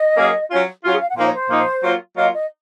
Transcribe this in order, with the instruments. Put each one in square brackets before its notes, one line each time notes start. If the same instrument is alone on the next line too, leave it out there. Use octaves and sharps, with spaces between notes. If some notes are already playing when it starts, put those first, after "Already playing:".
Already playing: [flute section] D#5
[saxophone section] F#3 A#3 C#4 G#4
F#3 C#4 F4
[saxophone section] F#3 C#4 F4 [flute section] F#4
[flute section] G#4
F5
F#5
[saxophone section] A#2 F3 A#3 D#4 [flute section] F5
[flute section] C#5
C5
[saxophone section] A#2 F3 A#3 D#4
F#3 A#3 F4
[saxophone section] F#3 A#3 F4 [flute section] D#5
[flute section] D#5